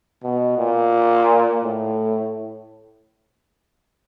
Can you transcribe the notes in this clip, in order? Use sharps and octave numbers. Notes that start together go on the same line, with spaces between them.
B2
A#2
A2